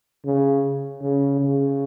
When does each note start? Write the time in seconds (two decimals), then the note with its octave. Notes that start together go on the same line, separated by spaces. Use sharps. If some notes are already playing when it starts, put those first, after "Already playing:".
0.25 C#3
1.01 C#3
1.40 C#3